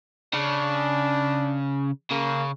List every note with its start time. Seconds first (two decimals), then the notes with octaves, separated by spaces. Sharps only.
0.33 C#3 D4
2.11 C#3 A#3